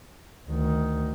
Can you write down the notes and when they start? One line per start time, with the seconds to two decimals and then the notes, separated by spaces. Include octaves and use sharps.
0.49 D2 D#3